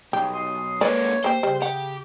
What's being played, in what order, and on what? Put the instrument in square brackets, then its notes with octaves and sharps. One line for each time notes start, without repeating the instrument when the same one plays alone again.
[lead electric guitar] B1 [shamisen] G4 [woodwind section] G#4
[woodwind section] C6 D#6
[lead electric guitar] G#3 A#3 [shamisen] B4 D5 [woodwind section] C#5
[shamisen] A#3 G4 [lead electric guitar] C5
[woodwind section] C#3 [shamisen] G3
[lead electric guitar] G4 [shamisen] F#5